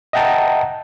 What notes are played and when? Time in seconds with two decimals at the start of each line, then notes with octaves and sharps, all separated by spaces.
0.13 D#5 E5 F#5 G5 A5 A#5